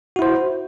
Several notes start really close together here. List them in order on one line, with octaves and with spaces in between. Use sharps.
F#4 E4 C5